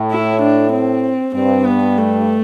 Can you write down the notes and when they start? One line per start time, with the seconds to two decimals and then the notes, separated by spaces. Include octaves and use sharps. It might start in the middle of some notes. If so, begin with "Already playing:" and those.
Already playing: A2
0.12 E4
0.43 D4
0.73 C4
1.35 G2 C4
1.66 B3
1.97 A3